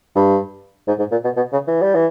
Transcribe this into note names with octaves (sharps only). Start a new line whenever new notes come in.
G2
G#2
G#2
A#2
B2
B2
C#3
E3
G3
E3